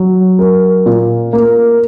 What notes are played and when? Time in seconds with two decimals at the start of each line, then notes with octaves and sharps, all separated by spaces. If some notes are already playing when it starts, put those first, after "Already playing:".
Already playing: F#3
0.39 A#4
0.86 A#2
1.33 A#3